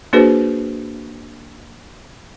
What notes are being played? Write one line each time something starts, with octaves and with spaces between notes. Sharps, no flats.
A#3 D4 F#4 G#4 B4 C5